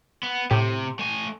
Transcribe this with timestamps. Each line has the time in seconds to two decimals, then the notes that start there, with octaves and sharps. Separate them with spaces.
0.23 B3
0.51 A2 C3 G4
0.99 A3 G#5